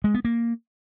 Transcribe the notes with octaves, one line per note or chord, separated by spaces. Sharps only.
G#3
B3
A#3